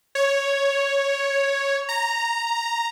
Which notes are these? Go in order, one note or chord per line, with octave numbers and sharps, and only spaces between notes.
C#5
A#5